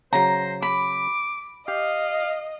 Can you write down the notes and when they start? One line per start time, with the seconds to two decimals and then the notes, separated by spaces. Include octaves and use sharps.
0.13 C#3 F#3 C5 A#5
0.62 B5 D6
1.68 G4 D#5 F5